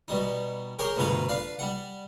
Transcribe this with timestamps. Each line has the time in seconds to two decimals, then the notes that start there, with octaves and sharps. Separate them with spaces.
0.08 B2 G3 D#4
0.79 G4 G#4 A#4 C#5 G5
0.96 D2 G2 B2 F4 B4 A#5
1.29 D4 B4 F5
1.59 G3 F#5